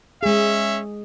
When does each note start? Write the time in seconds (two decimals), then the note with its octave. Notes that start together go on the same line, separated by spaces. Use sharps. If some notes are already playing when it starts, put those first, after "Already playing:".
0.23 G#3 C#4 G#4 E5